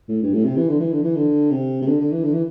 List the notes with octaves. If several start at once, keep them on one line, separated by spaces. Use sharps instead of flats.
A2
G2
A2
C3
E3
D3
E3
D3
E3
D3
C3
C3
D3
D3
E3
D3
E3